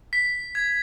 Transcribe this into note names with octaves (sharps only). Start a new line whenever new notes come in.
B6
G#6